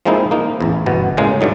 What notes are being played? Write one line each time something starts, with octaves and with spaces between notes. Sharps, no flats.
F3 G#3 A#3 C4 D#4 E4
A#3 D#4
A1 E2
G1 B2 B3
A2 C#3 G#3 A#3
G2 D3 F#3 D#4